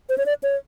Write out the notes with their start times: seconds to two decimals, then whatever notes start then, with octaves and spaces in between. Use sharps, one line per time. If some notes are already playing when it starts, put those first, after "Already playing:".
0.09 C5
0.18 C#5
0.26 D5
0.43 C#5